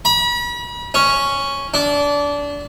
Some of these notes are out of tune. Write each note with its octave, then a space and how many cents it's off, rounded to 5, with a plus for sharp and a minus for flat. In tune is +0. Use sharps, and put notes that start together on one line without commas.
B5 -40
C#4 +0
D4 -25